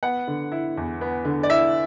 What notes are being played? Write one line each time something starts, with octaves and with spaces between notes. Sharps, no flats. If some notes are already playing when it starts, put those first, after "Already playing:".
B3 F#5
D3
E4
E2
B3
D3
D5
E4 E5